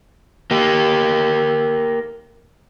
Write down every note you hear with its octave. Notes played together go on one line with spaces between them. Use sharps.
A#3 G4